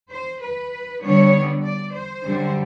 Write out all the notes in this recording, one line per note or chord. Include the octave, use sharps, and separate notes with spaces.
C5
B4
D3 G3 B3 D4 C#5
D5
C5
F#2 D3 G3